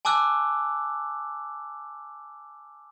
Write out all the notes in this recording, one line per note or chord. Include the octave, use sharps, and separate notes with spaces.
G#5 A5 D6 E6 F#6